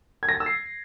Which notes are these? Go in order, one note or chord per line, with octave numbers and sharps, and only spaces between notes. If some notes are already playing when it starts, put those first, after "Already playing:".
G#6
A#6
A6
E6
C7